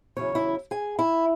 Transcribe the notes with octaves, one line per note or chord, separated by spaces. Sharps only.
E2 C#3 F#3 C#4 E4 C#5
E4 E5
G#4 G#5
E4 E5